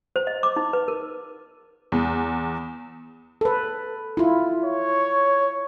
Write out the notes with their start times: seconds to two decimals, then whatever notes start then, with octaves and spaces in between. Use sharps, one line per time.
0.16 C5
0.27 D#5
0.43 D6
0.56 D#4
0.73 B4
0.88 A#4
1.92 E2
3.41 A4 B4
4.17 E4 F4
4.64 C#5